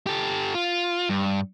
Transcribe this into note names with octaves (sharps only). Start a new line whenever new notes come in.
G4 A4
F4
G2